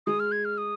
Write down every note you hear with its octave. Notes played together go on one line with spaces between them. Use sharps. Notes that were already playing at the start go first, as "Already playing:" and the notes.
G#3 D#6
F6
G#6
F6
D#6